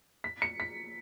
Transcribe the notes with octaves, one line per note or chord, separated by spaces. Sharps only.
B6
C#7
B6